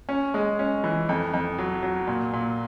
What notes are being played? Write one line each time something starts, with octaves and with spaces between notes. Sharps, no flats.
C#4
G#3
C#4
E3
F2
F2
F#3
F#3
A#2
A#2